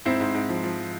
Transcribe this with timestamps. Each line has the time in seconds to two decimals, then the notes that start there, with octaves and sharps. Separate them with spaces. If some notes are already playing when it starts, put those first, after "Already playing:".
0.05 G#2 C4 E4
0.20 G#2
0.35 G#2
0.49 F3
0.64 F3